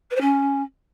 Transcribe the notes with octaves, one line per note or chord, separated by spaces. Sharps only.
B4
C5
C#4